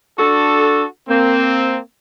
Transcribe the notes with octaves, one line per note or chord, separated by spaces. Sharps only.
D4 F#4 A4
A#3 C4